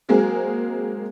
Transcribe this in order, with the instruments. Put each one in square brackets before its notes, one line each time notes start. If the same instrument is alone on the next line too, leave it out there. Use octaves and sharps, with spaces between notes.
[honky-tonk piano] F#3 G#3 A#3 C4 G#4